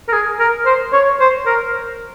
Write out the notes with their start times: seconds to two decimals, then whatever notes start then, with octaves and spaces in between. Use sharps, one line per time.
0.09 A#4
0.13 G#4
0.40 A#4
0.66 C5
0.93 C#5
1.20 C5
1.46 A#4